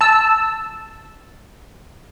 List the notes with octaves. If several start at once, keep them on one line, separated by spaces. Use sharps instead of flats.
A5 E6